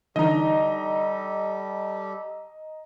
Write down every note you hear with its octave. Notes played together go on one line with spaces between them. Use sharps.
D3 E3 G3 D#4 G4 A4 D#5 A#5